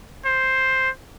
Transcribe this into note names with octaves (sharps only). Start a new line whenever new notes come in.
C5